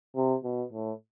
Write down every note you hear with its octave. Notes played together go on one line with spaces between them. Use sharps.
C3
B2
A2